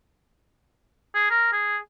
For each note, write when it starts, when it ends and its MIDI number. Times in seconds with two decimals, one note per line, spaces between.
1.15 1.30 68
1.30 1.48 70
1.52 1.77 68